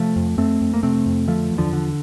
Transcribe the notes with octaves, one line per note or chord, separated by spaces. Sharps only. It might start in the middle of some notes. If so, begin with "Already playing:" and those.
Already playing: C3 F3 A3
F2
F2 A3 C4
F2
A#3
C3 A3 C4
F2
D3 F3 A3
E2
D3 F3
D3